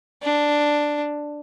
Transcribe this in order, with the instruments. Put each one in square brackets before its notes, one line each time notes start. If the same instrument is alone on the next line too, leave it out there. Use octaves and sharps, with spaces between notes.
[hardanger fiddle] D4